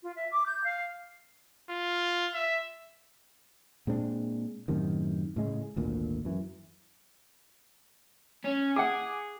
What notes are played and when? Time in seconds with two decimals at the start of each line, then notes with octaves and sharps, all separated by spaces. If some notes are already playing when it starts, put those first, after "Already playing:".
0.03 F4
0.16 E5
0.32 D6
0.46 G6
0.64 F5
1.70 F4
2.34 E5
3.87 A#2 G#3 C4 D4
4.68 F#2 A2 C3 D#3
5.36 A2 C#3 G#3
5.76 G#1 D2 A#2
6.25 F#2 E3
8.45 C#4
8.76 G#4 F#5 G#5 D6